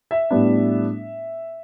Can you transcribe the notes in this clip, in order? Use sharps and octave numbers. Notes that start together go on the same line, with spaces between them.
E5
A2 G3 B3 D4